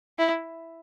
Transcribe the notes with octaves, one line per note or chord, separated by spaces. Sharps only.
E4